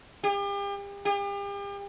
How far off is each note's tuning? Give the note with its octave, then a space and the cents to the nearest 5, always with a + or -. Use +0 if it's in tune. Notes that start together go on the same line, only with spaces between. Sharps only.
G4 +40
G4 +40